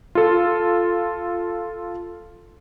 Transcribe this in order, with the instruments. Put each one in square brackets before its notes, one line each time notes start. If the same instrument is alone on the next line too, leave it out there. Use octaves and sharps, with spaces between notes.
[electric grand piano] F4 A4